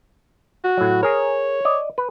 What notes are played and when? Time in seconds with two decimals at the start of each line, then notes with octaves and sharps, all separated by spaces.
0.64 F#4
0.77 A2 F#3
1.03 G#4 A#4 C#5
1.65 D5 D#5
1.98 B4